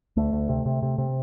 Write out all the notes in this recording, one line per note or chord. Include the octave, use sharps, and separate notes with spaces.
D2 A3
D2
C3
C3
C3
C3